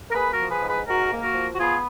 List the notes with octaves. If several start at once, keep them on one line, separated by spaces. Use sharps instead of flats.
A#4
A#3 G#4 B4
F#4 A#4
F3
G#4 B4
G#2
G#4 B4
G#2 F#4 A#4
A#3
F#4 A#4
F3
F#4
B3 F4 G#4